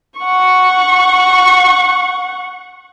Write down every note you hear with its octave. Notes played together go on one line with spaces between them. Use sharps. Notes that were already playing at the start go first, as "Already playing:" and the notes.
F#5 C#6